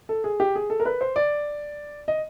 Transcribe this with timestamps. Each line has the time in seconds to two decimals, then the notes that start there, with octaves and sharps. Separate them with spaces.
0.09 A4
0.24 G#4
0.40 G4
0.56 G#4
0.70 A4
0.80 A#4
0.85 B4
1.01 C5
1.16 D5
2.08 D#5